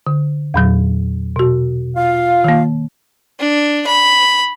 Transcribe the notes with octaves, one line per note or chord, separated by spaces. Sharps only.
D3
E2 A#2 F#3
B2 F#4
F4 F5
D#3 A#3
D4
B5